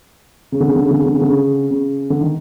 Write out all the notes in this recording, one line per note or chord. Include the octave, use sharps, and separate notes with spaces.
C#3
D3
C#3
D3
C#3
D3
C#3
D3
C#3
D3
C#3
C#3
D3
D#3